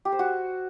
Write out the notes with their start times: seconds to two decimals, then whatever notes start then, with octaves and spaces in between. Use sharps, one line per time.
0.05 G4
0.12 C5
0.19 F#4